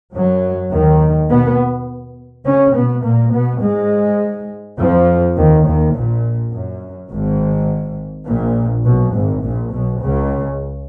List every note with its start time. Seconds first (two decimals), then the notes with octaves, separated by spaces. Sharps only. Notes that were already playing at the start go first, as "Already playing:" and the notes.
0.14 F#2 F#3
0.72 D#2 D#3
1.30 B2 B3
2.46 C#3 C#4
2.75 B2 B3
3.04 A#2 A#3
3.33 B2 B3
3.62 G#2 G#3
4.79 F2 F3
5.37 D#2 D#3
5.66 D#2 D#3
5.94 A#1 A#2
6.52 F#2
7.11 G#1 G#2
8.27 A#1 A#2
8.85 B1 B2
9.14 G#1 G#2
9.43 A#1 A#2
9.72 B1 B2
10.02 C#2 C#3